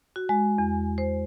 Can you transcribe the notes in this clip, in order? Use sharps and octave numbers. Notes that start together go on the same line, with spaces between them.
F#4
G#3
E2
C5